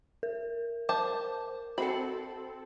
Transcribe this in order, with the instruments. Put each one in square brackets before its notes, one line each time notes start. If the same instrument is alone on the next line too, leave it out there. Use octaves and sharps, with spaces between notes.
[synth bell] A#4
[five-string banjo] C5 A5 [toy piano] D6
[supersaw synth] C4 A4 [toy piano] F#4 F#5 G5 [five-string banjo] B5